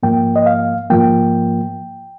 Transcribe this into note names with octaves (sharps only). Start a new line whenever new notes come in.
G#2 F3 A#3 G5
D#5
F5
G#2 F3 A#3 G5